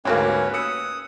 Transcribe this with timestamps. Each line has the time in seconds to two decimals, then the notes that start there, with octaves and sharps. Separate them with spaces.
0.05 D2 G#2 A#3 C#4 F#4 G4 B4 C#5
0.54 D#6 E6 F#6 C#7